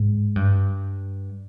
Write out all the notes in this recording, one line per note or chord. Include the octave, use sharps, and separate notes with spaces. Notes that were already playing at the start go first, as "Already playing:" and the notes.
Already playing: G#2
G2